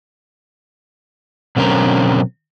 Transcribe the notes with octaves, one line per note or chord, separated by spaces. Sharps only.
B2 D3 F#3 C4 C#4 A#4